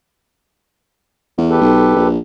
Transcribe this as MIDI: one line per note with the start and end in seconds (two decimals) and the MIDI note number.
1.38 1.57 40
1.50 2.08 67
1.50 2.08 69
1.50 2.08 71
1.61 1.91 35
1.96 2.18 34